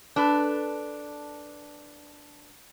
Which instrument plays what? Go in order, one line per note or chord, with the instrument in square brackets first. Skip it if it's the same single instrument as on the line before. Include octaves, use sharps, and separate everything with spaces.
[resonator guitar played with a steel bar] D4 A4 B4